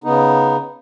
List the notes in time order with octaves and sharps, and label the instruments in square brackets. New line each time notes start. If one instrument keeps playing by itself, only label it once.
[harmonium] C#3 B3 D#4